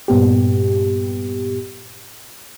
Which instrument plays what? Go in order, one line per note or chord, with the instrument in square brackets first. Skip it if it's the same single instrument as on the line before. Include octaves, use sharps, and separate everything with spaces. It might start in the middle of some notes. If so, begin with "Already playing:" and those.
[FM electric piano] G2 A#2 B3 G4